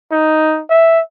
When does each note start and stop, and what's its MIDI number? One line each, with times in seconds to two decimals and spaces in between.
0.12 0.61 63
0.70 1.00 76